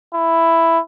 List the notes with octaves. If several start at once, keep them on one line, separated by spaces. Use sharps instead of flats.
E4